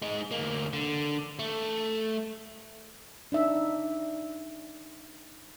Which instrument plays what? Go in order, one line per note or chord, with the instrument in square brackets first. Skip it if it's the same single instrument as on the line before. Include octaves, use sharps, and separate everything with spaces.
[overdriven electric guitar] G#3 D#4
D2 A#3
D3
A3
[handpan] D4 D#4 E5